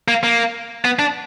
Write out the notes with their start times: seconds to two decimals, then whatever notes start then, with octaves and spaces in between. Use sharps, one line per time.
0.08 A#3
0.23 A#3
0.85 B3
0.99 D4